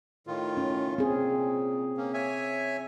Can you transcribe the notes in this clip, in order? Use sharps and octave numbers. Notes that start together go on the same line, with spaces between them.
A2 D#3 F4
C#4
A#2 C4 G#4
A#3 C#4
C#5 E5 G#5